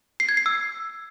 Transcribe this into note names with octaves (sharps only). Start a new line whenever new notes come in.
C7
G#6
C7
E6